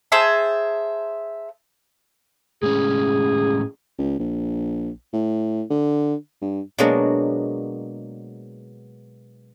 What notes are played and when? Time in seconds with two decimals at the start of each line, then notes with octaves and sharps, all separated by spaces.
0.12 G#4 C5 E5 A5
2.63 A2 G#3 C#4 G#4
3.99 C#2
4.19 A#1
5.13 A2
5.70 D3
6.42 G2
6.78 B2 F#3 G#3 A#3 D4 F#4